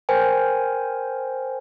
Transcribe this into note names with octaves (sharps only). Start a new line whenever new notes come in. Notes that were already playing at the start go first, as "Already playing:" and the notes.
A#4 C5 G5 G#5